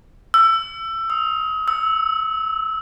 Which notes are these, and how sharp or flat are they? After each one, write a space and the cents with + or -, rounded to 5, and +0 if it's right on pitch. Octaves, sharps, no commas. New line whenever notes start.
E6 +20
D#6 +40
E6 -15